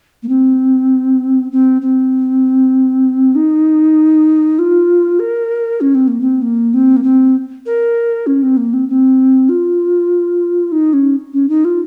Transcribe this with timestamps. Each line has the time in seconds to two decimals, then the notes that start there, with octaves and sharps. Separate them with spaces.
0.23 A#3
0.29 C4
1.52 C4
1.82 C4
3.35 D#4
4.59 F4
5.19 A#4
5.81 C#4
5.95 C4
6.08 A#3
6.21 C4
6.42 A#3
6.74 C4
6.96 A#3
7.03 C4
7.66 A#4
8.27 C#4
8.43 C4
8.57 A#3
8.73 C4
8.89 C4
9.49 F4
10.72 D#4
10.93 C#4
11.33 C#4
11.49 D#4
11.65 F4